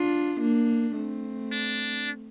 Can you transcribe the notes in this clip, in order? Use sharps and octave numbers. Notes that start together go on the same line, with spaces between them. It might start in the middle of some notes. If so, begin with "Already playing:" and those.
Already playing: D4 F4
A#3 D4
A3 C4
D4